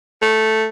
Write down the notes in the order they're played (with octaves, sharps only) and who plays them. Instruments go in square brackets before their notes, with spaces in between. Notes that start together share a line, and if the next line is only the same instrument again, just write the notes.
[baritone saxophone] A3